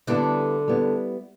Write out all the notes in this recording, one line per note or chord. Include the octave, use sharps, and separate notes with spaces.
D3 G3 B3 D4 E4
G3 B3 E4